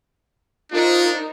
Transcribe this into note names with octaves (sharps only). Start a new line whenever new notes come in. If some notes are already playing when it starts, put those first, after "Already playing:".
D4 D#4 F4 A#4 C5